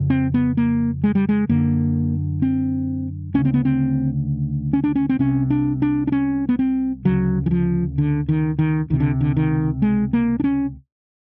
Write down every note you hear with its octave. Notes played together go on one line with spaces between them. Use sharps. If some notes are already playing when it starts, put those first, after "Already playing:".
Already playing: F2 C#3
C4
B3
A#3
G#3
G3
G#3
F#2 D3 A#3
C4
D2 C#3 C#4
C4
B3
C4
C#4
D4
C#4
C4
C2 C3 C#4
D4
D4
D4
C#4
B3
C4
D2 C#3 F#3
E3
F3
D3
D#3
D#3
C#2 C3 D#3
D3
D3
D#3
G#3
A#3
D4
C#4